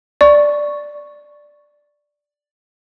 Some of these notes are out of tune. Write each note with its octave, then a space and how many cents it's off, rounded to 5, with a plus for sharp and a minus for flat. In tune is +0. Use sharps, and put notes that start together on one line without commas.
D5 +0 C#6 +0